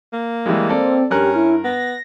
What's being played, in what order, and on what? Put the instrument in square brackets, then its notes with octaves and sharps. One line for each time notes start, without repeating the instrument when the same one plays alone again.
[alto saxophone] A#3
[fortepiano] E3 G3 G#3
[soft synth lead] C4 [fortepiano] A4 D5
[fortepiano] G2 A#4 F#6 [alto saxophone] C#4 [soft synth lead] G4
[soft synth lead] E4
[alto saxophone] B3 [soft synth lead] A#6